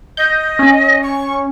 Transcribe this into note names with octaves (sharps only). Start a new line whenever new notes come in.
D#5 G6
C#4
C#6